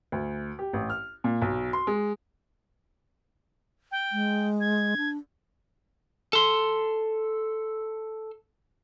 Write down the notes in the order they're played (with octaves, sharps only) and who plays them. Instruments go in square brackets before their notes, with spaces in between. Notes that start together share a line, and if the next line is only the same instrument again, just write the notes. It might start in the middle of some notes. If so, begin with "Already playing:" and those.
[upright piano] D2
G4
A1
F6
A#2
B1
C6
G#3
[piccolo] G5
[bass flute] G#3
[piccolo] G#6
[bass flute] D4
[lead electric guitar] A4 C6